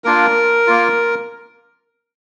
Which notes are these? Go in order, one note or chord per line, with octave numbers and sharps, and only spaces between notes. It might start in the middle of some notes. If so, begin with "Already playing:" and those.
A#3 D4 F4 A#4
A#3 F4